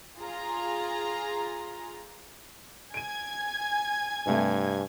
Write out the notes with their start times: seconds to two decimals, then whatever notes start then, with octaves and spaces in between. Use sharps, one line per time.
0.18 F4 G#4 A#5
2.94 G#5 G#6 D7 D#7
4.27 G2 C3 A3